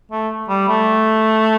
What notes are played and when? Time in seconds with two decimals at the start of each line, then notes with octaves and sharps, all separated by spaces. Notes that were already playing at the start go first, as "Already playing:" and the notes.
0.11 A3
0.49 G3
0.68 A3